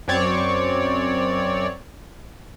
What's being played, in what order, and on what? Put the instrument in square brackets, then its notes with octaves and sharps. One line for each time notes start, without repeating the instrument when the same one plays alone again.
[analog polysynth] F#2 C4 C#5 D5